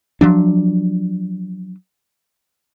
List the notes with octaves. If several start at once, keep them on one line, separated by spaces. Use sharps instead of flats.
F3 F#3 D4